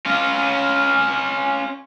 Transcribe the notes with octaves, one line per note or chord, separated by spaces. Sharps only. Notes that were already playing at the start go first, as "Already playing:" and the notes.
C#4 F4